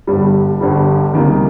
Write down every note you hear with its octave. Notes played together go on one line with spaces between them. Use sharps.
G1 G2 G3
G1 G2 G3
C#2 C3 D#3 G3 A#3